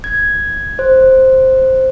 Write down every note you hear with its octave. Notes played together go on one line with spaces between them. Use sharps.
G#6
C5